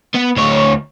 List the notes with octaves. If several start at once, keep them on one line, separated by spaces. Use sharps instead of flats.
B3
D2 C#5